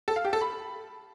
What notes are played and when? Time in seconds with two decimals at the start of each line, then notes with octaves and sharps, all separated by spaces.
0.08 A4
0.16 F5
0.24 G4
0.33 A4
0.41 B5